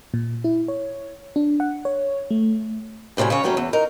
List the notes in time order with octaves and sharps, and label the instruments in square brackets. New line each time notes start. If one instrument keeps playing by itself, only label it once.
[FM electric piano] A#2
E4
C#5
D4
F#5
C#5
A3
[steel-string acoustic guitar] F#2 A2 C3 G3 G#5
C#3 C#4 C#5
F#3 G3 A3 A#3 C#4
E2
D#4 A#4